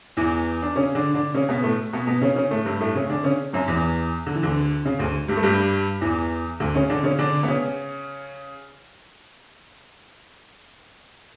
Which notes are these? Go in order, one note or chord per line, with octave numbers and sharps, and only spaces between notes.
E2 E3
D4
C#3 C#4
D3 D4
D3 D4
C#3 C#4
B2 B3
A2 A3
B2 B3
B2 B3
C#3 C#4
C#3 C#4
A2 A3
G2 G3
A2 A3
C#3 C#4
D3 D4
C#3 C#4
F#2 F#3
E2 E3
D3
E3
D2 D3
C#3
D2 D3
G2 G3
A3
G2 G3
E2 E3
D2 D3
C#3 C#4
D3 D4
C#3 C#4
D3 D4
B3
C#3 C#4